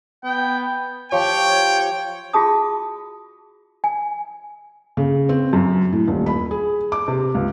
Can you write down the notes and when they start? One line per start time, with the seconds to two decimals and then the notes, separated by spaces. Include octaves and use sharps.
0.24 B3 G5
1.12 F3 G4 C#5 G5
2.33 F4 F#4 G#4 A5 D#6
3.84 G#5
4.97 C#3
5.29 C4
5.53 F#2
5.93 A2
6.08 D#1
6.26 B5
6.51 G#4
6.92 D6
7.08 C3
7.35 C#2